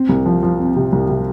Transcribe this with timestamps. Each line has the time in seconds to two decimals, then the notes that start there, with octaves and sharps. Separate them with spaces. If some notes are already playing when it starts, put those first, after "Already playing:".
Already playing: C4
0.09 C2
0.26 F3
0.43 F3
0.59 C4
0.76 C3
0.92 C2
1.09 C3